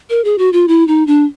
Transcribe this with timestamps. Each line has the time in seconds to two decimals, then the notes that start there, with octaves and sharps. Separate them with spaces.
0.10 A#4
0.24 G#4
0.38 F#4
0.53 F4
0.68 E4
0.88 D#4
1.07 D4